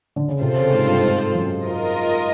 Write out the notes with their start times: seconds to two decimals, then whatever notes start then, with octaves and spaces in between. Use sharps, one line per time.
0.16 D3
0.28 C#3
0.41 C3 C4 F4 A4 C5
0.57 C#3
0.72 G#2
0.86 G2
0.98 G#2
1.34 F#2
1.65 F4 A#4 D#5